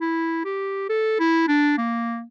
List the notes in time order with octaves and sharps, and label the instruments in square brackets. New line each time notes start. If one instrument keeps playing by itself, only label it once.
[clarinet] E4
G4
A4
E4
D4
A#3